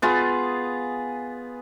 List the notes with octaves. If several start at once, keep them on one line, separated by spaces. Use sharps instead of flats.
B3 F4 G#4